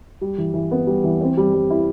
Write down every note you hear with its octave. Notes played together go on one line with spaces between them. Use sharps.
G3
E3
E3
B3
G3
E3
C4
G3
G3
E4